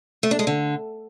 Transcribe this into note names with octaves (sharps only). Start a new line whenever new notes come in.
A3
D4
G#3
D3